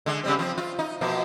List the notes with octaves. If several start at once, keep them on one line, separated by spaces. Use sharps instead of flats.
D3 G#3
C#3 G3 C4
F3 C4
F4
D#4
B2 F3 A#3